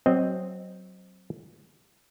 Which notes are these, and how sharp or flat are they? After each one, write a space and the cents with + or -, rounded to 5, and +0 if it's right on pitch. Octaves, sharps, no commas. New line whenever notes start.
F#3 +15 C4 +0 D#5 +0